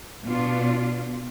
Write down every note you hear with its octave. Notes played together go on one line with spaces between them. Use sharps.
B2 B3 D4 F4